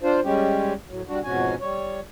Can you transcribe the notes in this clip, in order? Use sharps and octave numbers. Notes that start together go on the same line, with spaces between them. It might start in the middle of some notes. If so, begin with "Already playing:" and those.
D4 F4 C5
G3 G#3 C#4 G4
A2 F#3
G3 D4 F#4
F2 G#2 B2 C#4 F#4 G#5
G3 C#5